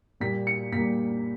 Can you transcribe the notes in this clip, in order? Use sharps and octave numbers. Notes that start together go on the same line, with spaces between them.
A#2 G3 A#3 B6
C#7
A#2 G3 A#3 B6